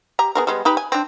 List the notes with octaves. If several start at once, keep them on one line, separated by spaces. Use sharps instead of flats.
G4 A#5
B3 G#4 A#4
G3 G#3 B3
D#4 G4 B4
G#5
C4 D4